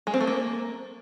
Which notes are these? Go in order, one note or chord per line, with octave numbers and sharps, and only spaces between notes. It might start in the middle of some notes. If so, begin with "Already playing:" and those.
G#3
C4
A3
A#3